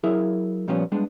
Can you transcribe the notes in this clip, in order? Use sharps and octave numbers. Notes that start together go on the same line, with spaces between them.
F#3 E4 G#4 A#4 E5
A#2 F3 G3 B3 C#4
G3 G#3 B3 D4